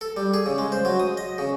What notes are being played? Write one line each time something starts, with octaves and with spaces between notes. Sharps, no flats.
A4
G3
G#4
C#3
G#3
C5
F#3
D#6
D#5
C#3